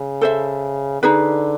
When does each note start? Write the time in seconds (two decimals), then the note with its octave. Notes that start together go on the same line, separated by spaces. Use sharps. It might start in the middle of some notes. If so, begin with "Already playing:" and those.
Already playing: C#3
0.21 A4 C5 E5
1.02 D3 D#4 G#4 B4